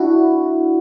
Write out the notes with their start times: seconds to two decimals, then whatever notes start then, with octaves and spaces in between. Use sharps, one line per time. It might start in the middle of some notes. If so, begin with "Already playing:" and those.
Already playing: D4 E4 F#4